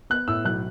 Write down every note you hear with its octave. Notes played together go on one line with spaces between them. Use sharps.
B3 F#6
A2 E6
B1 F#6